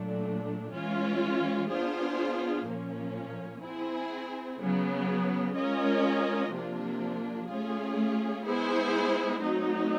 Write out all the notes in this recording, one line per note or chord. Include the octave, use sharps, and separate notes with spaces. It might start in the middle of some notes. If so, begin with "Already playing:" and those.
Already playing: A#2 F#3 A3 D4
E3 G#3 C#4 F4
B3 D4 F4 G#4 C5
A#2 F3 A#3 C#4
C4 E4 G#4
C#3 F#3 B3
G#3 C#4 F4 A#4 D#5
C3 F3 A#3 D4 F4
A3 C#4 F4 G#4
G#3 B3 E4 G#4 C5
F#3 A3 C4 D#4